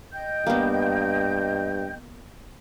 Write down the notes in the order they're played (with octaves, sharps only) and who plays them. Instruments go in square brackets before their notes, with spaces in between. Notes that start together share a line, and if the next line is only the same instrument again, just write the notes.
[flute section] D#5 G5 G6
[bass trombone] G2 [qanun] A#3 B3